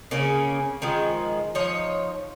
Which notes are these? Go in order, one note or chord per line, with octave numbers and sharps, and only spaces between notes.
C#3 A#3 C#4 G#4
D#3 F3 G#3
F3 D#4 C#5